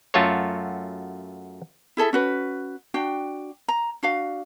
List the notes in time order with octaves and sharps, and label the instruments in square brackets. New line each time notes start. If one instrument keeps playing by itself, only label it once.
[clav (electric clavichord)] F#2 A3 F4 F#4 A4 C#5
[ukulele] E4 G#4 A4 E5
C#4 F#4 B4
D4 F#4 G5
A#5
D4 F#4 F5